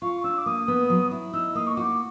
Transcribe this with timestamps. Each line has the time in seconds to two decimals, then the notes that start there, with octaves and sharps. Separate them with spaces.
0.02 F4 C#6
0.24 D4 E6
0.38 D6
0.46 A#3 D#6
0.68 B3
0.90 F#3
1.11 E4
1.33 D#4 E6
1.55 A#3 D#6
1.67 C#6
1.77 F#4 D6